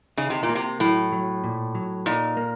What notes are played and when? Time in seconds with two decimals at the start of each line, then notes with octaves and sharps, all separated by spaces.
0.17 C#3 D#4
0.30 C3
0.43 A#2
0.49 A#3
0.55 C3
0.80 A2 F#3
1.12 F#3
1.44 A#2
1.75 F#3
2.06 A#2 D#4
2.37 A#3